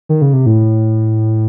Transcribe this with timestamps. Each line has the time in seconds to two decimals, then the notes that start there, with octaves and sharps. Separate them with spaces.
0.09 D#3
0.22 C#3
0.33 C3
0.46 A2